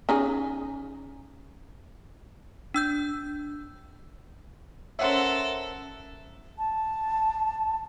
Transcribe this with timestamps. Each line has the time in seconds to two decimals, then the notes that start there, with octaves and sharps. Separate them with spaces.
0.09 C#4 D#4 G#4
2.74 D4 E6 G6
4.99 C#4 A4 A#4 C5 C#5 E5 F#5 C6
6.58 A5